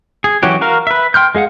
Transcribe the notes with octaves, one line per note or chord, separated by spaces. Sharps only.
G#4
E3 F#3 C#4 F#4 G4
F#4 A#4 F5
B4 E5
G5 C6 F6 G6
G#3 G#4 F5 F#5